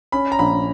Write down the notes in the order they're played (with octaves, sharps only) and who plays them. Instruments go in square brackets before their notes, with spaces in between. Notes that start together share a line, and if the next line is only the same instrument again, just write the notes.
[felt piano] C#4 [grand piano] B5
[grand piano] A#5
[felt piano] A#1 [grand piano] B5